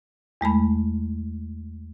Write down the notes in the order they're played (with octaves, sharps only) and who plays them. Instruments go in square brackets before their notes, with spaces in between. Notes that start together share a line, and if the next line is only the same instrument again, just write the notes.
[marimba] E2 G#3 A3 B5